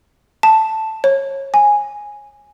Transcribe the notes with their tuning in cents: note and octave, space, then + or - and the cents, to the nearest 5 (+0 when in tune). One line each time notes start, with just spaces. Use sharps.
A5 +0
C#5 -25
G#5 -5